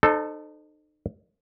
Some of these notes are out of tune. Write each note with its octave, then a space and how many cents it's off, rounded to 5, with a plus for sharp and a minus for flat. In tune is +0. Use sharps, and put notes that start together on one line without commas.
D#4 -35 A4 +0 C5 +0